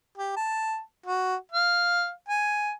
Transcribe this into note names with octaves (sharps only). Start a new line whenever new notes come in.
G4
A5
F#4
F5
G#5